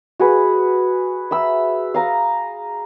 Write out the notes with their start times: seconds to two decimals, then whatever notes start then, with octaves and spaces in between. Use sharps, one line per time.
0.20 F#4 G#4 B4
1.31 E5 B5 E6
1.94 F5 A#5 D#6